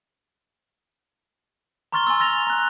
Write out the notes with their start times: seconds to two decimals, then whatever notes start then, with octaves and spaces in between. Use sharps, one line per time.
1.92 A#5 C6 C#6 F6 A6 G7
2.07 G#5 C6 E6
2.20 E6 A6 A#6 F7
2.47 A#5 F#6